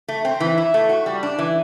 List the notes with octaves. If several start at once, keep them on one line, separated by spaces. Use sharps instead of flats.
A3
C4
E3
E4
A3
F#4
G3
D4
E3